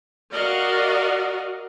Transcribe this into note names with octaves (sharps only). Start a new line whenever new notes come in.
F#4 A#4 D5 D#5 F5